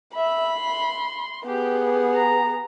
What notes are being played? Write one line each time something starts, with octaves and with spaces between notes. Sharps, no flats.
E5 B5
C6
B3 G4 G#4
A#5